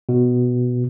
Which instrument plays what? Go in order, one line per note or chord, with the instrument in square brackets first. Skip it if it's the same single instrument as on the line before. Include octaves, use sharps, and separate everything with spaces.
[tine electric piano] B2